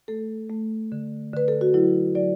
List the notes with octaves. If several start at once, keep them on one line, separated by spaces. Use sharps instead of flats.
A3 A4
A3
D3
D3 B4
A4
F#4
F#3 E4
F#3 D5